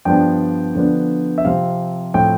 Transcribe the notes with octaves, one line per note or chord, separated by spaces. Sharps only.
G2 F3 B3 D4 G5
D3 F3 B3 D4
E5
C3 F3 C4 F5
A2 F3 C4 G5